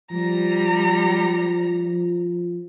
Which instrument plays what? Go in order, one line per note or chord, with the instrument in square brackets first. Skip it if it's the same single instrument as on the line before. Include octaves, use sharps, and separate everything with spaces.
[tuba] F3 [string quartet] G3 A#5